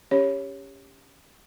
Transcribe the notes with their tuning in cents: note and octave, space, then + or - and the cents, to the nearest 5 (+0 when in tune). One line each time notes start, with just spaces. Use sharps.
C#4 +10 G4 +20 C#5 +0